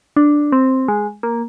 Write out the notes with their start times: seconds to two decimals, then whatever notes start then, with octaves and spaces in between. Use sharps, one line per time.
0.16 D4
0.52 C4
0.88 G#3
1.23 A#3